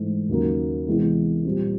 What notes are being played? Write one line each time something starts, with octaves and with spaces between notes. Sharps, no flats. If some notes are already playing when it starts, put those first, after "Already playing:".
Already playing: G#2 E3 A3
D#2 C#3 F#3 A#3
C3 E3 G#3 B3 E4
A#2 G3 C4